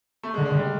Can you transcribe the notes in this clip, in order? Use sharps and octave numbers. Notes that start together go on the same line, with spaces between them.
A3
G#3
D3
G#3
D3
G3